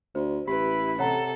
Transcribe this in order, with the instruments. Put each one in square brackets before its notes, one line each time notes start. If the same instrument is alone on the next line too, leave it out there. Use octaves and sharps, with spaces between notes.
[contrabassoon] D2 [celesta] C5
[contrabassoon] A1 [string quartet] E4 B4 [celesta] G4 [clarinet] B5
[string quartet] C3 A4 [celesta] C#5 F#5 A#5